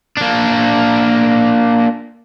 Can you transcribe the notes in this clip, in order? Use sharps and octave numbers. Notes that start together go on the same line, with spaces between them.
A#3 D4